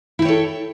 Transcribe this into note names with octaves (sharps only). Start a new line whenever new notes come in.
E4 A4 C#5 G5